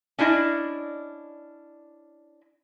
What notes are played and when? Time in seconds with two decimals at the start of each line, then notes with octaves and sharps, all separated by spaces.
0.18 C#4 D4 E4 D5 D#5